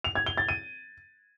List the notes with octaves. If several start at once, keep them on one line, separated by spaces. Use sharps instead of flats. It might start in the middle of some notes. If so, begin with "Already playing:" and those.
F7
G#6
G7
A6
D#7